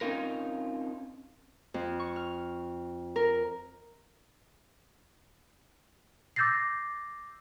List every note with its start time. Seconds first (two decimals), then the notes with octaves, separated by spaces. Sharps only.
0.01 C4 C#4 D#4 F4 A#4
1.74 F2
2.00 C#6
2.16 F6
3.16 A#4
6.36 D6 E6 G6 A6 A#6 C7